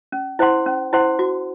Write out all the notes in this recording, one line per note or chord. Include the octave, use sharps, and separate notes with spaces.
C#4
E4 C5 F#5 C6
C#4
E4 C5 F#5 C6
F#4